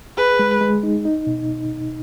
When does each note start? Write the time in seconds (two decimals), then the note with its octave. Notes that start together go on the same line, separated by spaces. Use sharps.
0.17 G#4 B4
0.39 G#3
0.61 G#3
0.83 D#4
1.05 D#4
1.27 B2